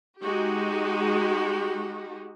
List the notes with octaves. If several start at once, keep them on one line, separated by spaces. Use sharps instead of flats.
G#3 D#4 F#4 G4